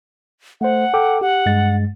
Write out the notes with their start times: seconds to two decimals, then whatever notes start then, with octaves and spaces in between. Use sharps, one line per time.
0.61 A3 C5 F#5
0.94 A4 G5 D6
1.21 G4 F#5
1.46 G2 G#3 A6